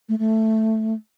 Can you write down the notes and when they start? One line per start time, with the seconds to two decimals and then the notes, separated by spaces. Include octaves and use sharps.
0.09 A3
0.19 A3